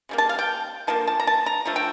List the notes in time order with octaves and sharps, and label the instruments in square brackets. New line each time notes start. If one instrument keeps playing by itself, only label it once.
[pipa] C#3 G3 A#3
A5
F5
G5
D3 F3 A#3 A5
A5
A#5
A5
A#5
D3 F3 A3
G5